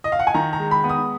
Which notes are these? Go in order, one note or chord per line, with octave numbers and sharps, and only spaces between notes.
D#5
F5
F#5
G#5
D#3 A#5
A#5
G#3
B5
B3
D#6